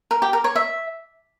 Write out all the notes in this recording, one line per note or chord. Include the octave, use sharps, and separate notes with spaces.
A#4
G4
A#4
C#5
E5